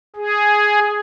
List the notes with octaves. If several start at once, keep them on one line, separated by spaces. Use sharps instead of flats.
G#4